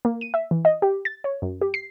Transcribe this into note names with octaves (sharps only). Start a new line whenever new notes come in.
A#3
D#7
E5
E3
D#5
G4
A6
C#5
F#2
G4
C7